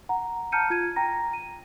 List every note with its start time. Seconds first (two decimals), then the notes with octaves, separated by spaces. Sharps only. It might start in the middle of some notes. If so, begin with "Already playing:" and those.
0.09 F#5 A#5
0.52 A5 A#5 F6 G6 C#7 D#7
0.70 F4 G#6 D#7
0.96 G5 A#5 A#6
1.33 D#7